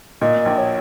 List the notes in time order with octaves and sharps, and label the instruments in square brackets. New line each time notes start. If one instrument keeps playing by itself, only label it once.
[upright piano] A#2 [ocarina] D#5
[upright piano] A#1
[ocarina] C#5